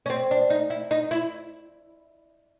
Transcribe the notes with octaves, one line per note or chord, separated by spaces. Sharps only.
C#4
C4
D4
D#4
E4
D#4
E4